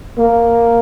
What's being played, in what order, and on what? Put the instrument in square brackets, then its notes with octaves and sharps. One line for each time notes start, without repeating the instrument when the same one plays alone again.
[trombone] A#3